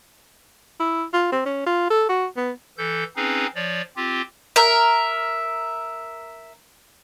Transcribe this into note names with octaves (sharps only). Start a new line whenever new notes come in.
E4
F4
C4
C#4
F4
A4
F#4
B3
E3 A4 G6
C4 C#4 D#4 G#4 B4 F5
F3 C#5 D5
C4 F4 G4
A#4 E5